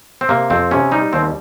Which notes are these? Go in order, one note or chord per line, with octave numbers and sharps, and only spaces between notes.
C4
C3 A#3
F2 C4
C3 C#4
G3 D#4
D#2 C4